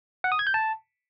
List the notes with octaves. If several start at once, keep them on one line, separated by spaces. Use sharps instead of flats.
F#5
D#6
G#6
G6
A5